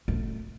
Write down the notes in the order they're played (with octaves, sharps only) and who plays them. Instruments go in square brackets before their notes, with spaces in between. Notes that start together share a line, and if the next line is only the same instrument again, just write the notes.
[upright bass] A3